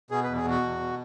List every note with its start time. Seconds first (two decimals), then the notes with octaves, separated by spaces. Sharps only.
0.11 B2 G#4
0.24 B4
0.28 E2
0.37 G#4
0.45 B2 F#4
0.63 E2
0.80 B2